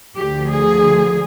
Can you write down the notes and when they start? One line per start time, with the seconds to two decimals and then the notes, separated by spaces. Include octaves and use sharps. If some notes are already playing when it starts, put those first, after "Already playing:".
0.16 D2 D3 F3 G4
0.48 G#4